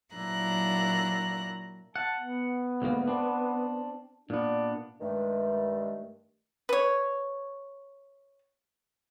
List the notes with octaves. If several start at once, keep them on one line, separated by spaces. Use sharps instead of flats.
A#2 F#3 D4 E4 A#5 F#6
F#5 A5
B3
D2 G#2 A#3
C4 D4
A#2 B3 D4
G2 D#3 G#3 A3
B4 C#5